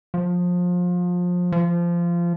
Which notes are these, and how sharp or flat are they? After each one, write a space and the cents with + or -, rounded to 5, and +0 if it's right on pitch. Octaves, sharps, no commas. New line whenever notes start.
F3 +25
F3 -20